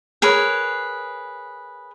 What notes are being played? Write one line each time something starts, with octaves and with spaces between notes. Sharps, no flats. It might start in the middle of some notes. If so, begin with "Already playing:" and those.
G#4 A#4 B4 C#5